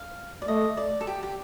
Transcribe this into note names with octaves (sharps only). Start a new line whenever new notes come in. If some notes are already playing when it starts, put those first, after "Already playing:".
Already playing: F5
D5
A3 D#5
D5
A4
G4
G4